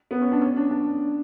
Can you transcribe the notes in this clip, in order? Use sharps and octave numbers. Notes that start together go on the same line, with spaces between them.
B3
C#4
D4
C#4
D4
D4